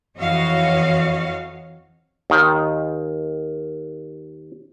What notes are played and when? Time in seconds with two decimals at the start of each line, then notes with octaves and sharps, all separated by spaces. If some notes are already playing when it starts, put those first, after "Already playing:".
0.18 F2 E3 F#4 C#5 D#5 F5
2.30 D#2 D#3